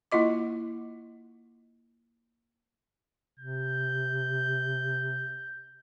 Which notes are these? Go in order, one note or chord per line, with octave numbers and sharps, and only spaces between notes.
A#3 E4 F4 D#5 D6
C3 G6